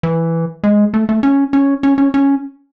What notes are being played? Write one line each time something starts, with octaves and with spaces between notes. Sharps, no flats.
E3
G#3
A3
A3
C#4
C#4
C#4
C#4
C#4